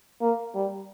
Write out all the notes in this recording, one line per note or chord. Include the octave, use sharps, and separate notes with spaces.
A#3
G3